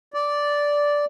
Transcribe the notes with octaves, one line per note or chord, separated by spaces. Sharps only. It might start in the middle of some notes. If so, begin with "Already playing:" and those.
D5